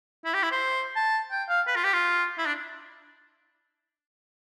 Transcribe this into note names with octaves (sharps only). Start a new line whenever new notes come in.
E4
G4
E4
C5
A5
G5
F5
B4
F4
G4
F4
E4
D4